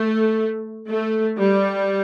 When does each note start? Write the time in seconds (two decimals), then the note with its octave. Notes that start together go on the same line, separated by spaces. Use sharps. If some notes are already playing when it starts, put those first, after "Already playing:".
Already playing: A3
0.89 A3
1.38 G3